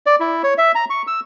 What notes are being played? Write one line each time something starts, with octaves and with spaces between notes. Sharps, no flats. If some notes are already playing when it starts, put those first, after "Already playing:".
D5
E4
C#5
E5
A#5
C#6
E6